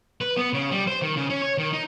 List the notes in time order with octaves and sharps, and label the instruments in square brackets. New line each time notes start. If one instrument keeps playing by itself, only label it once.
[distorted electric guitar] B4
B3
C#3
G3
C5
D#3
C#3
C#4
C#5
D#3
D#4